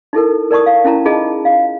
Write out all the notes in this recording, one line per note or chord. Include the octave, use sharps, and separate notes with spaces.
D#4 E4 A4 A#4
A#4 D5 A5 C#6 D#6
F5
C#4 E4 A5 A#5
D#4 F4 G#4 D#5 A5
F5